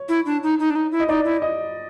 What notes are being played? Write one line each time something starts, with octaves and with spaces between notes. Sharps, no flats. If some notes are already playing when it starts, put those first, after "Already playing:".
Already playing: C#5
E4
D4
D#4
D#4
D4
D#4
E4
D#5
D#4 D5
E4
D#5